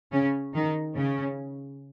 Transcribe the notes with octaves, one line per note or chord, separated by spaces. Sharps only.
C#3 C#4
D#3 D#4
C#3 C#4